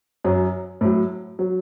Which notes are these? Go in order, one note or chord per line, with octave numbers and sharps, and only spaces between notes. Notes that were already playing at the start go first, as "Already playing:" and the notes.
F#2 F#3
A2 F#3
F#3